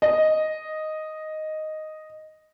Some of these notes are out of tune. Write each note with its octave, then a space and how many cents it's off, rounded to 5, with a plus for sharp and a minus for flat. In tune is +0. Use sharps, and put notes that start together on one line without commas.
D#5 +0